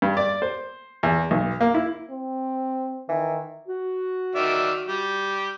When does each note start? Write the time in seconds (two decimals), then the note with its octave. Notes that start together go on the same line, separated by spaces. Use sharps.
0.02 G2
0.17 D5
0.42 C5
1.03 E2
1.31 B1
1.61 A#3
1.74 E4
2.10 C4
3.09 D#3 E3
3.68 F#4
4.35 D#3 D5 E5
4.87 G3 G4